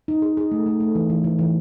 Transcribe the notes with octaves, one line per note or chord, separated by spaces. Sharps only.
D#4
G#4
G#4
A3
A3
A3
E3
E3
E3
E3